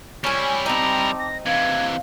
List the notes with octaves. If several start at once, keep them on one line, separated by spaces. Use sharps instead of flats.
G3 C#4 E4 G#5
C4 D#4 G5 A5 A#5 D6
A#6
C3 E3 F5 G#6